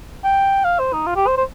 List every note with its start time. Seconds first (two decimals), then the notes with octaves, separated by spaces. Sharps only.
0.24 G5
0.65 F5
0.79 C5
0.93 D#4
1.07 F4
1.16 G4
1.27 C5
1.37 C5